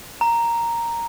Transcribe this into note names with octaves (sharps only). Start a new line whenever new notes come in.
A#5